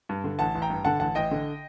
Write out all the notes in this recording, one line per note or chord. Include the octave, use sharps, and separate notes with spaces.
G2
D3
A1 F#5 A5
A1
G5 A#5
G2
D3 F#5 A5
A1 F#5 A5
A1 D#5 G5
D3